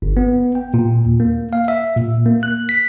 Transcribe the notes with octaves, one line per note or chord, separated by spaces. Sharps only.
G1
B3
G5
A#2
D#2
A#3
F5
E5
A#2
A#3
F#6
B6